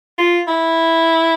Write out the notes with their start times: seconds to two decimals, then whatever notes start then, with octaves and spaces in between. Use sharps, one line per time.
0.18 F4
0.48 E4